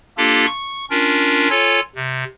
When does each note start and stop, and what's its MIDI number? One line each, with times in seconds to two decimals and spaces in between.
0.17 0.46 58
0.17 0.46 62
0.17 0.46 65
0.17 0.46 67
0.17 0.46 69
0.47 0.85 85
0.90 1.49 61
0.90 1.49 62
0.90 1.49 65
0.90 1.49 70
1.50 1.80 65
1.50 1.80 69
1.50 1.80 73
1.50 1.80 80
1.95 2.24 48